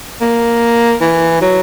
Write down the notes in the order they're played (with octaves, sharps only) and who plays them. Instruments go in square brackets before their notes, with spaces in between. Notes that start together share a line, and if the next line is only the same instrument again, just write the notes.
[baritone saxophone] A#3
E3
F#3